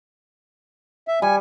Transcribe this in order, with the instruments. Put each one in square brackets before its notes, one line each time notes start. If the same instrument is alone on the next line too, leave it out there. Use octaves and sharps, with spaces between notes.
[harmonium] E5
[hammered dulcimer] G3 [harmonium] G#5